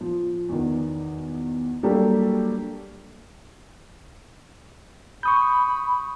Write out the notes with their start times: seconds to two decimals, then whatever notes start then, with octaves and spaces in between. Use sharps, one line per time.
0.01 F3
0.49 E2 B2 D#3 B3
1.83 F#3 G3 A#3 D4 G4 A4
5.23 B5 C#6 D#6 G6